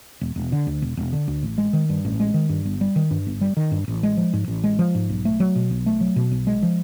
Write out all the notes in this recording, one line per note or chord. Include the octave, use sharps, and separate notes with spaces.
E1
E1
D3
D2
E1
E1
D3
D2
A1
G#3
D#3
G2
A1
G#3
D#3
G2
G1
G3
D#3
G2
G1
G3
D#3
G2
A1
G#3
F3
G#2
A1
G#3
F3
G#2
B1
A3
F#3
B2
B1
A3
F#3
B2
B1
G#3
F3